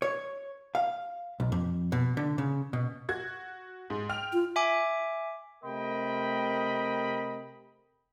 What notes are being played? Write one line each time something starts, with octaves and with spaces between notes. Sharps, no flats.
C#5
F5
B1
F2
B2
D3
C#3
B2
F#4 G#6
G#2
G5 F6 F7
F4
E5 G#5 D6
C3 A3 A#4 D#5 G5 B5